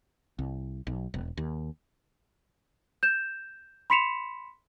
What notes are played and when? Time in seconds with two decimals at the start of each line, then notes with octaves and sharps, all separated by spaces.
0.39 C2
0.87 B1
1.14 E1
1.37 D#2
3.03 G6 E7
3.90 B5 C6 B6 C#7 E7 F7